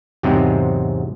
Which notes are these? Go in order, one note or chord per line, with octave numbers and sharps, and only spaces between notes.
E2 G#2 C3 F#3 G#3 C4